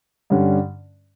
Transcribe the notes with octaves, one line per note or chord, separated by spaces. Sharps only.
G2 D3 G3 C#4